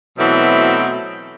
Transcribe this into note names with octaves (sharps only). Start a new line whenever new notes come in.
B2 E3 F#3 A3 C4